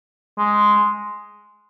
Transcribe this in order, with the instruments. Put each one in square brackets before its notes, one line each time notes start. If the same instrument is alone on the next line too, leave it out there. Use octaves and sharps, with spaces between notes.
[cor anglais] G#3